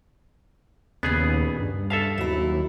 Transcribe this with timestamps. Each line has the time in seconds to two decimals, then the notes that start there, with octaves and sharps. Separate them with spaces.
1.03 D#2 A#2 C#3 B3 G#4
1.59 G2
1.90 A4 E5 F5 A5
2.18 D#2 F#3 E4